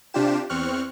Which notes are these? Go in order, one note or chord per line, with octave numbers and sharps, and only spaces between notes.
C3 D4 F4 G4 E7
E2 C4 C#6 F6 F#6